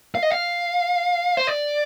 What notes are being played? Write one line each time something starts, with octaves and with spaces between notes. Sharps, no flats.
F5
D#5
F5
C5
D5